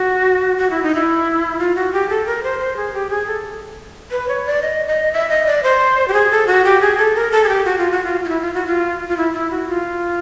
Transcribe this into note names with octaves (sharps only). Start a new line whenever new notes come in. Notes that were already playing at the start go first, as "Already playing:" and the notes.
Already playing: F#4
F#4
E4
D#4
E4
F4
F#4
G4
A4
A#4
C5
C5
G#4
G4
G#4
A4
B4
C#5
D5
D#5
D#5
E5
D#5
D5
C5
G4
G#4
A4
F#4
G4
G#4
A4
A#4
A4
G#4
G4
F#4
F4
F#4
F4
F4
E4
F4
F#4
F4
F4
E4
E4
F#4
F4